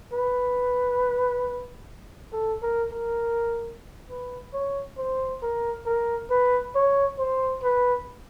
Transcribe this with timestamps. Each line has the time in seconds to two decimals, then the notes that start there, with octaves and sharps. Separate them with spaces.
0.13 B4
2.33 A4
2.62 A#4
2.92 A#4
4.10 B4
4.53 C#5
4.98 C5
5.42 A#4
5.86 A#4
6.30 B4
6.75 C#5
7.18 C5
7.63 B4